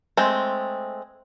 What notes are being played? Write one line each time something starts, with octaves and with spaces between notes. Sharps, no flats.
G#3 A3 C4